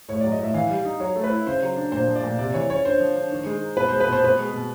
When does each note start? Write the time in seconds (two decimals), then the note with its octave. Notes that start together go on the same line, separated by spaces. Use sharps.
0.08 A2 C#5
0.21 F#3 D5
0.32 D#5
0.39 A2 E5
0.54 E3 F5
0.70 G3
0.85 D#4
1.00 F#3 C#5
1.16 A3
1.24 B4
1.31 E4
1.46 C#3 C5
1.62 F#3
1.76 D4
1.92 A#2 C5
2.07 F3
2.16 D5
2.24 A#2
2.38 C3 D5
2.53 E3 C#5
2.70 C#4 C#5
2.84 D3 C5
3.00 F3
3.15 D4
3.31 D#3
3.46 G#3
3.61 D#4
3.76 B2 B4
3.88 G#3 C5
4.01 B4
4.08 B2 C5
4.23 B2 B4
4.39 G#3
4.53 B2